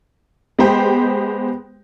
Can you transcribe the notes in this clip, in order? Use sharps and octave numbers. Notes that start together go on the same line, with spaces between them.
G#3 B3 G4 C5 G5